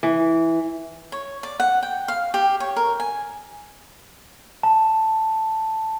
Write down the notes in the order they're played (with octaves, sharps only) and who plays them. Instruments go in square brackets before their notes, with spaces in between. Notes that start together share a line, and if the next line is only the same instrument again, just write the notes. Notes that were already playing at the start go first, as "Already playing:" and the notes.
[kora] E3
[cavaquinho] C#5
D5
F#5
G5
F5
G4
C#5
A#4
G#5
[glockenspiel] A5